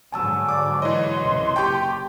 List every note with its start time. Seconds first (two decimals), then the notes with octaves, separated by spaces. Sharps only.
0.12 G#2 D3 F#3 G#5 A5 E6
0.49 D5 D6
0.82 E3 C#5 D#5 C6
1.20 C#2 F#2 C3
1.56 F#1 G4 G5 A5 C#6 G6